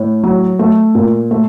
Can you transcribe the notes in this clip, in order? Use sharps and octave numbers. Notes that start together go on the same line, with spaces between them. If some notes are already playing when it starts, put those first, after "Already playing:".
Already playing: A2
F#3
A3
A#2
A3